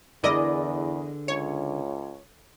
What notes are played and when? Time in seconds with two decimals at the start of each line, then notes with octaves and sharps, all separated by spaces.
0.24 E2 D3 E4 G#4 A#4 B4 D5 D#5
1.28 C#2 C#5